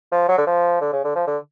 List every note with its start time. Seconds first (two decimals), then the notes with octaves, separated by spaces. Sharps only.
0.12 F3
0.28 F#3
0.38 D3
0.47 F3
0.81 D3
0.93 C#3
1.04 D3
1.15 F3
1.27 D3